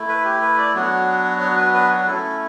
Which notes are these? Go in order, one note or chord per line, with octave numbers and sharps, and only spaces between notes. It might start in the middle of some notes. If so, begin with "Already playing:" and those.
Already playing: A3 E4
B4
G4
B4
D5
F#3 B3 D4 F#4 C#5
C#5
B4
B4
C#5
A3 C#4 E4 A4